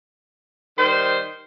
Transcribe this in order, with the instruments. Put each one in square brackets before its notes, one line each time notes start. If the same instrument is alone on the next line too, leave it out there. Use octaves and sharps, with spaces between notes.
[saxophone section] D#3 G3 C5